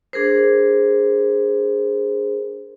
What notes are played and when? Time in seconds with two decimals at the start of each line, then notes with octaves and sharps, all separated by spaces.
0.13 D4 G#4 A#4 C5